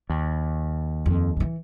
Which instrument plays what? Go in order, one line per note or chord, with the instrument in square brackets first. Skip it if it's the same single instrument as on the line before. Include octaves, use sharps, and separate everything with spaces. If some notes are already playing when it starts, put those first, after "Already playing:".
[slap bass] D#2
[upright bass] F2
D3 E3